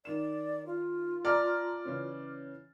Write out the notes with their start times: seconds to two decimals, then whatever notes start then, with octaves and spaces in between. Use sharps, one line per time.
0.05 D#3 D5 E7
0.66 F4
1.25 D5 A5 A#5 F6
1.85 C#3 E3 C#4